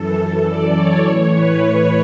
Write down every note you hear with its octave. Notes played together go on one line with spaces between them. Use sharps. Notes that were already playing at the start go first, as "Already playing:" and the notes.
Already playing: F#2 E3 A4
A4
D5
C#5
A2 E3 C#5
B4
C#5